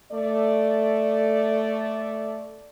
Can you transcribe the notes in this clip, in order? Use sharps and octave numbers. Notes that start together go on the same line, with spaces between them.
A3 D5